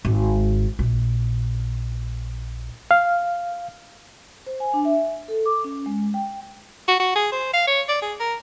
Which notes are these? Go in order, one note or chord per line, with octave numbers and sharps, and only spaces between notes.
G#1
A#1
F5
C5
G#5
D4
E5
A4
D6
C#4
G#3
G5
F#4
F#4
G#4
C5
F5
C#5
D5
G#4
A#4